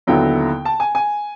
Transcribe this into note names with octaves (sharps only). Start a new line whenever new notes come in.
D#2 D3 F#3 B3 E4 G5
A5
G#5
G#5